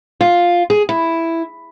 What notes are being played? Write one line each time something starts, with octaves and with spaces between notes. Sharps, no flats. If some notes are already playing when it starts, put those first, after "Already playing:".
F4
G#4
E4